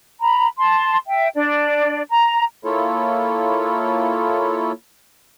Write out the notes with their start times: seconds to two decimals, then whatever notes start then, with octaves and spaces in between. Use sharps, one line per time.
0.21 A#5 B5
0.58 A5 C6
1.07 E5 G5
1.35 D4 D5
2.10 A#5
2.64 A#3 E4 F4 A4 C#5